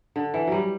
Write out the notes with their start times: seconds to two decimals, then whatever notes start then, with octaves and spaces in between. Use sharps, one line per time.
0.16 D3
0.34 E3
0.47 F#3 G3